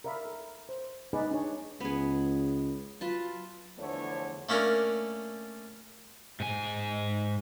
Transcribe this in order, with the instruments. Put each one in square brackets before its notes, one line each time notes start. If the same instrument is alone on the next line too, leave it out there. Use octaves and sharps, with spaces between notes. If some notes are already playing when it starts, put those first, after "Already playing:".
[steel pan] A#4 D5 E5 F5 B5
A4
C5
G#3 B3 D#4 G#4 B4 D5
D4 G#4 C#5
[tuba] C#2 [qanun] B3 G#4
[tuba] F#3 [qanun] F4 B4 A5
[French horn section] E2 D3 F3 A3 B3 C#5
[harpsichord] A3 A#3 C#4 D4 A#4
[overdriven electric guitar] G#2 G#5